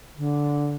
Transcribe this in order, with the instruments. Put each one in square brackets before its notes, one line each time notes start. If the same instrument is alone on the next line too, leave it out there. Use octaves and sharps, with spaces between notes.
[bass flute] D3